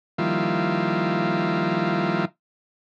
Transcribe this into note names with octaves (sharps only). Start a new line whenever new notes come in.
D#3 F3 G3 A#3 E4 F4